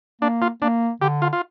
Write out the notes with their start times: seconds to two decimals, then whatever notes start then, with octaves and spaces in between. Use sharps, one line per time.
0.21 A#3 D4
0.42 F4
0.62 A#3 D4
1.01 D3 G4
1.22 F4
1.33 F4